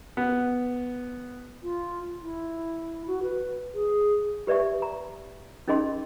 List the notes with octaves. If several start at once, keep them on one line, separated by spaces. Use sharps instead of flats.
B3
F4
E4
F#4
B4
G#4
G4 B4 D5 E5 C#6
A#5
C#4 D#4 G#4 D#5 C6